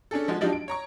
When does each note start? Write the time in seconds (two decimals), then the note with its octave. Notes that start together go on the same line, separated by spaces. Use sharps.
0.11 C#4 D4 G#4 A4
0.28 F3 G#3 F#4
0.41 F3 F#3 D4 D#4 F4 G4
0.53 D7
0.68 C#5 A#5 C#6